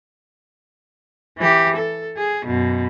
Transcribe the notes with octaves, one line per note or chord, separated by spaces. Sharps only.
E3 G4
A4
G#4
F#2 B2